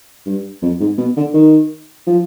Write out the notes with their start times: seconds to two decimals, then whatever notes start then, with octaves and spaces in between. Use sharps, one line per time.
0.26 G2
0.62 F2
0.80 G#2
0.98 B2
1.17 D3
1.34 D#3
2.07 F3